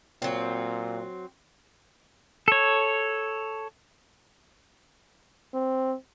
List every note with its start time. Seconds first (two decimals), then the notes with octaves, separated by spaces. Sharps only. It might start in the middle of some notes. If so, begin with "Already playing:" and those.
0.22 A#2 F#3 C4
2.48 A4 C#5
5.54 C4